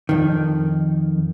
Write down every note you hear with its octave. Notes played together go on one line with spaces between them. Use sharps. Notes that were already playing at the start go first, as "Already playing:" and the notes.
F2 D#3